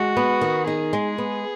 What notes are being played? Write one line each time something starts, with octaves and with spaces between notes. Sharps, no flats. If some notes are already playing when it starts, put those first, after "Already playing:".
Already playing: G#3 F#4
B3
D#3
D#4 G#4
G#3
B3